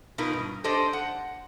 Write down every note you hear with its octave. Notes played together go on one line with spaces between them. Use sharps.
B2 D#4 F4 A#4 B4
G2
D4 G4 A4 C5 D5 D#5
F#5